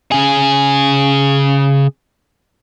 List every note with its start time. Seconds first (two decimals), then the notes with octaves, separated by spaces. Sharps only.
0.12 C#3 G#4